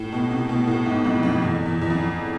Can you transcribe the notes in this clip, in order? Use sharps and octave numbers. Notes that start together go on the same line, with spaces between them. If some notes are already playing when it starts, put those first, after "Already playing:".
Already playing: A2
B2
C3
B2
A2
G#2
F2
F2
E2
E2
E2
F2